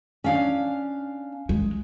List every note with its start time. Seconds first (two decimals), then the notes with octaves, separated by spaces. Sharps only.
0.24 C#4 D4 F5
1.49 G#3